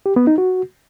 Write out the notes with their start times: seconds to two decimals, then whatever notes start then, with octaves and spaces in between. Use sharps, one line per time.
0.06 G4
0.16 B3
0.27 D#4
0.38 F#4